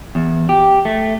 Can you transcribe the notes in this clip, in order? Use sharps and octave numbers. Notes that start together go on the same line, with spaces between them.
E2
G4
A3